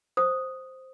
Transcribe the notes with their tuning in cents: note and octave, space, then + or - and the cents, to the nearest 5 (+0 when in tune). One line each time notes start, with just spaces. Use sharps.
C5 +0 D#6 +0